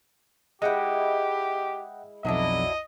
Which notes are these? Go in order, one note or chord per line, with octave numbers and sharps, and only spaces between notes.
G#3 E4 G4 D#5 F#5 G5
B1 F2 F#3 D4 E4 D#5